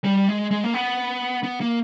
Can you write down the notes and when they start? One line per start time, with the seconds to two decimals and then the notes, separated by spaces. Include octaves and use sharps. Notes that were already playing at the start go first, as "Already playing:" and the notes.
0.04 G3
0.28 G#3
0.51 G#3
0.64 A#3
0.74 B3
1.43 B3
1.61 A#3